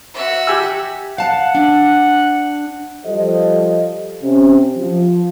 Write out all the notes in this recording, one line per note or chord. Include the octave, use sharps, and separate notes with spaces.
F#4 E5
G4 G#5 E6
F5 F#5 A5
D4
F3 G3 A4 C5 D#5
C3 C#4
F3